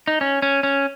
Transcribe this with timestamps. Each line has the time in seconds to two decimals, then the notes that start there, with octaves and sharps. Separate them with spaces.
0.07 D#4
0.21 C#4
0.42 C#4
0.63 C#4